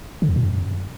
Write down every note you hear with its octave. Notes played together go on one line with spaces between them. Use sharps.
D3
E2
A#2
F#2